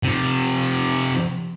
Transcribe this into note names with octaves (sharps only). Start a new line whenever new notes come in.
C3 F3